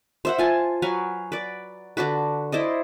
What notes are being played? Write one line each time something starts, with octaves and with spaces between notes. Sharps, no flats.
C5 E5 F#5
F4 G#5 A5
F#3 B4 F5 G#5
B4 D5
D3 D4 F#4 B4
E4 C5 D5 D#5